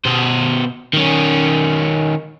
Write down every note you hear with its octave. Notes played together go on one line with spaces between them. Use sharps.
B2 C5
D#3 C#4